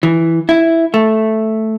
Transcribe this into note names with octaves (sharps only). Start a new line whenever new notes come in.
E3
E4
A3